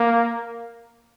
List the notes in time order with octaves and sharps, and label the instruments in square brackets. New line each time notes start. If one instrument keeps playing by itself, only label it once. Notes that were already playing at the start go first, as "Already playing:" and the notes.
Already playing: [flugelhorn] A#3